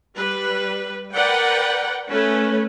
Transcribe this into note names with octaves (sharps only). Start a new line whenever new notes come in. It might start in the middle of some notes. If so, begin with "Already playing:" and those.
G3 B4
A#4 B4 D5 F#5 G5
A3 C#4 B4